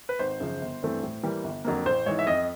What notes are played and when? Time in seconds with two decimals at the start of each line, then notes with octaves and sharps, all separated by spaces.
0.09 B4
0.19 G#1 C5
0.40 F#2 C#3 F3
0.61 G1
0.82 G2 E3 A3 C4
1.03 A2
1.23 E3 G3 A#3
1.44 G1
1.65 F2 D3 F#3 A#3
1.85 A1 C5
2.06 G#2 E3 C#5
2.19 E5
2.27 F2 D#5